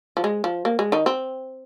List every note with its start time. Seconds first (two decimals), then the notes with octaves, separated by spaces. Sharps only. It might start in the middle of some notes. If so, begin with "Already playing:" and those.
0.17 F3
0.24 G#3
0.44 F3
0.65 A#3
0.79 G#3
0.92 D#3 D#4
1.06 C4